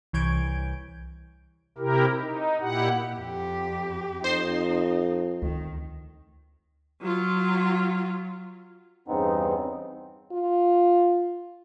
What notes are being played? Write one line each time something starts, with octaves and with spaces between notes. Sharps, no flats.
C2 E3 C#5 G6 G#6 D7
C3 E4 G4 A#4
D#4
A#2 E4 G4 F#5
F2 G4
F2 D#4 C5 C6
D2 D#3
F#3 F4
E2 G2 C#3 B3 C4 D#4
F4